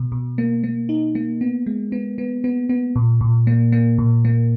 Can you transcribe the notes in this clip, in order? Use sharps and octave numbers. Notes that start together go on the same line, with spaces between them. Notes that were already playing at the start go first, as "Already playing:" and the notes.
Already playing: B2
B2
A#3
A#3
D#4
A#3
B3
G#3
B3
B3
B3
B3
A#2
A#2
A#3
A#3
A#2
A#3